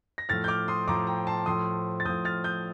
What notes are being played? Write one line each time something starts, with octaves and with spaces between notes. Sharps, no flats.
A#6
A2 F3 F6 A6
G6
D6 F6
C6 D#6
A2 F3 A#5 D6
G5 A#5
A5 C6
A2 F3 C6 D#6
A6
A2 F3 D#6 G6
F6 A6
D#6 G6